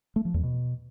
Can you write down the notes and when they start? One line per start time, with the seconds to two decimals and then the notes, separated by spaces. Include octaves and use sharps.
0.16 A3
0.25 F3
0.34 E2
0.43 B2